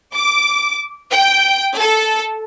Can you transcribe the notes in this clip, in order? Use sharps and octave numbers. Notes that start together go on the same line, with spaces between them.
D6
G5
A4